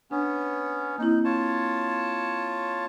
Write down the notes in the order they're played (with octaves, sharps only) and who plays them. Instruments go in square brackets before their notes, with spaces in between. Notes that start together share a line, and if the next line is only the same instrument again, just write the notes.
[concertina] B3 C#4 [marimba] D4
[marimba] A#3 C4 E4 [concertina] D#4
[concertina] F4 C#5 A5